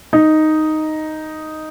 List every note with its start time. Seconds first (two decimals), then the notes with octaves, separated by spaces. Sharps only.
0.13 D#4